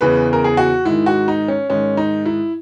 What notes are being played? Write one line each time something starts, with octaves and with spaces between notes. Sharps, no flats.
E2 C#3 E3 B4
A#4
G#4
F#4
G#2 D#3 E4
F#4
D#4
C#4
G#2 D#3 C#4
D#4
E4